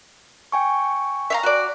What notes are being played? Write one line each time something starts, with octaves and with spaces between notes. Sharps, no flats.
G5 G#5 C#6
E5 F5 A#5
F#4 D5